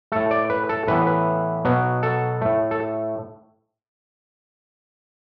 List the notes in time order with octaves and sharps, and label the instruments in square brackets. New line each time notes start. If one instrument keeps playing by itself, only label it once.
[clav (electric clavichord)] A2 A3 A4
D5
B4
A4
A2 E3 B3 B4
B4
B2 F#3 B3
A4
A2 A3
A4